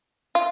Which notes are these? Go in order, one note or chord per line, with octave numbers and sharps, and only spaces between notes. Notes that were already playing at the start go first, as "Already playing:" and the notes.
F4